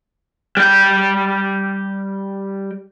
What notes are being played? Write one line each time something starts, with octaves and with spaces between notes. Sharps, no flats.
G3 G5